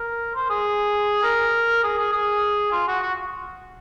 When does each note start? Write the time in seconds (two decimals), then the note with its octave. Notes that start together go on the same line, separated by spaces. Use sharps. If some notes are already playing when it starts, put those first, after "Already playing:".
Already playing: A#4
0.35 C5
0.50 G#4
1.23 A#4
1.83 G#4
1.98 G#4
2.13 G#4
2.72 F4
2.88 F#4
3.02 F#4